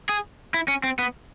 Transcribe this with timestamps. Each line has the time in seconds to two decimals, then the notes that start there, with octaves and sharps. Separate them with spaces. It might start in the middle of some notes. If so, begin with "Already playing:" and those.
0.09 G#4
0.54 E4
0.68 C#4
0.84 C4
0.99 B3